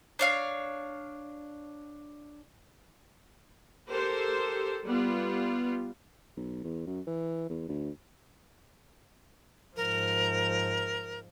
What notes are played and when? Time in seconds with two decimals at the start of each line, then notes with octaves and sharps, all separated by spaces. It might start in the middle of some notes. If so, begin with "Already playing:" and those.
0.19 D4 C#5 F5
3.88 G4 A4 A#4 C5
4.85 G3 B3 F4
6.37 B1
6.64 E2
6.87 F#2
7.07 E3
7.50 E2
7.69 D2
9.77 G#2 F3 A#4